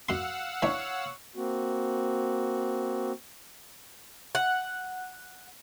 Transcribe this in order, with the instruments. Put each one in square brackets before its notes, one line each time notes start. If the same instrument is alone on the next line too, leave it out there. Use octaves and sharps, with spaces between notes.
[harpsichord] F#2 C6 [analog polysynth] F5 F#5 E6
[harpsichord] E3 D4 [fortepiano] C#5
[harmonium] A#3 C4 F#4
[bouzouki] F#5